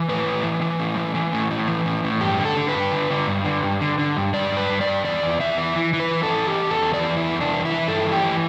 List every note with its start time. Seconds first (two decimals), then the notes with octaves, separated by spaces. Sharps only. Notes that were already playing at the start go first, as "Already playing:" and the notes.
Already playing: E3
0.09 A2 B4
0.26 A2
0.43 E3
0.62 E3
0.79 A2
0.97 E3
1.15 E3
1.33 A2
1.51 A2
1.68 E3
1.85 A2
2.03 A2
2.21 G2 G4
2.39 D3
2.45 A4
2.57 D3
2.69 B4
2.75 G2
2.92 D3
3.10 D3
3.27 G2
3.45 D3
3.63 G2
3.81 D3
3.99 D3
4.17 G2
4.34 G2 D5
4.52 G2
4.57 B4
4.70 G2
4.81 D5
4.87 G2
5.04 E2 D5
5.22 E2
5.40 E2 E5
5.58 E3
5.76 E3
5.93 E3
6.00 B4
6.11 E3
6.23 A4
6.29 E3
6.47 E3 G4
6.64 E2
6.70 A4
6.82 E2
6.94 D5
6.99 E3
7.17 E2 E4
7.35 E2
7.41 D4
7.53 E3
7.65 E4
7.71 E3
7.88 G2 A4
8.06 E3
8.12 G4
8.24 E3